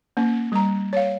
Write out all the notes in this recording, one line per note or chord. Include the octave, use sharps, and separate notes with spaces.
A#3 C#4
G3 A#5
C#5 F5